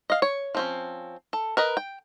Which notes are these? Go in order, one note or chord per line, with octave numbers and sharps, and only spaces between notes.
D#5 F5
C#5
F3 C4 C#4
A4
A#4 B4 D#5
G5